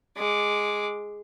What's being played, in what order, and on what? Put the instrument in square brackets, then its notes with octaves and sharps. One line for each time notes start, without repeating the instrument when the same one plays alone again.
[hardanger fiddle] G#3 D6